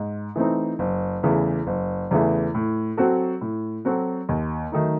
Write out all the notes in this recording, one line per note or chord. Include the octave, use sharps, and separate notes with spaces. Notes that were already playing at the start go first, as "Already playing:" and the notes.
Already playing: G#2
E3 A3 C4 D#4
F#1
E2 C#3 E3 A3
F#1
E2 C#3 E3 A3
A2
F#3 C4 F#4 A4
A2
F#3 C4 F#4 A4
D#2
D#3 F#3 A3 D#4